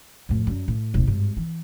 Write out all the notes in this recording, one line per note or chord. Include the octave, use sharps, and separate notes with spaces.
F2 A2
F#2 G3
A2
D#1 C2
G#1 G2
E3